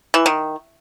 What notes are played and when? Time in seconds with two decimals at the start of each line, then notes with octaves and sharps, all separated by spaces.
0.14 E3
0.26 D#3